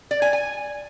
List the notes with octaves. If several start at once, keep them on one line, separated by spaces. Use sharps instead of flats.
D5
G#5
G#5